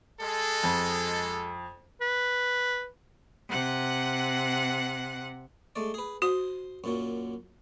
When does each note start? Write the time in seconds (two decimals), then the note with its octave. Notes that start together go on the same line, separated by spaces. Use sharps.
0.20 G#3 A4
0.64 F2
2.01 B4
3.48 C3 F#5 F#6
5.76 G#3 A3 D5
5.94 G#4 B4
6.22 F#4 C5 D#6
6.84 F#2 A#2 F#3